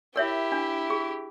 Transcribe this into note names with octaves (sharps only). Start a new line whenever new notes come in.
E4 G4 A#4 C#5 E5
D4
G#4